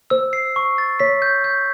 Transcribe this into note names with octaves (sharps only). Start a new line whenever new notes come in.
C5 E6
C7
C#6
A6
C#5 B6
G6
G6